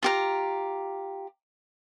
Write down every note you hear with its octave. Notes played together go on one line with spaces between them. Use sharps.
F4 G4 A#5